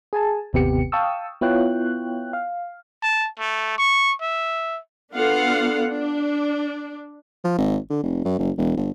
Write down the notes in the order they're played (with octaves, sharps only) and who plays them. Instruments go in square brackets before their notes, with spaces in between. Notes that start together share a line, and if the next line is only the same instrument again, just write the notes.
[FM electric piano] G#4 G#5 A5
G1 D#2 C3 B3 G4 C#7
F5 G5 A5 C#6 D#6 E6
B3 E4 F4 C#5 G5 F#6
F5
[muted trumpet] A5
A3
C#6
E5
[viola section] B3 D4 F4 A4 F5 F#5
D4
[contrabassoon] F3
G#1
D3
F1
F#2
F#1
E1
G1